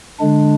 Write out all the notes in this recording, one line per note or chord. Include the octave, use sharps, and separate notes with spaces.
D3 G#3 D4